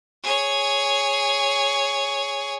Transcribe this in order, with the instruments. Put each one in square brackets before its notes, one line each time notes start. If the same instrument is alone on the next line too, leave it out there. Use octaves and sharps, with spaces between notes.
[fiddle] G#4 C#5